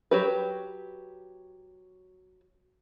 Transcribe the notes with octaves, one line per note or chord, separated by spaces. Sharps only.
F#3 G4 B4